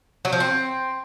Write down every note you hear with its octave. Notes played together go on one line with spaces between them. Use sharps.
F#3
F3
C4